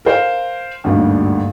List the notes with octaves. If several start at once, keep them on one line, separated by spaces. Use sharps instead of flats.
A#4 C5 F5 G5
G#1 D2 G2 A#2